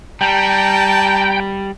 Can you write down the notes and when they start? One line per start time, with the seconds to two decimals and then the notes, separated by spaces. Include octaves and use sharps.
0.21 G3 G5 A5 A#5